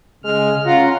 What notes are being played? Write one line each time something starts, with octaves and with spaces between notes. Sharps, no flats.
C#3 G#3 F6
C#4 F4 F#5 A#5